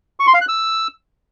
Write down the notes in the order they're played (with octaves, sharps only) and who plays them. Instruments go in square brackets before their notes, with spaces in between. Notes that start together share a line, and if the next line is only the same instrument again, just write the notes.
[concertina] C#6
C6
F5
F#6
E6